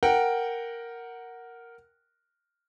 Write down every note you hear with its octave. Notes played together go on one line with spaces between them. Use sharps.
A#4 F#5 G5